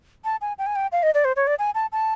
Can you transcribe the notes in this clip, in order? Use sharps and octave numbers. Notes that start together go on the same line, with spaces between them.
A5
G#5
G5
G#5
G5
F5
D#5
D5
C5
C#5
D5
G#5
A5
A5